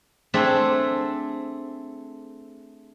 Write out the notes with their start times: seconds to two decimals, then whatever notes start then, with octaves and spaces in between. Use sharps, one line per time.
0.34 A3 C4 D4 G#4 E5